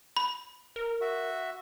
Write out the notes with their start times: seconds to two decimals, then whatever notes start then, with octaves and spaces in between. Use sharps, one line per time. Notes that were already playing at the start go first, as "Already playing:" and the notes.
0.17 B5
0.76 A#4
1.01 F#4 E5